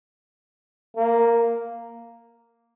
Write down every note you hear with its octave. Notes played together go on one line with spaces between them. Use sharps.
A#3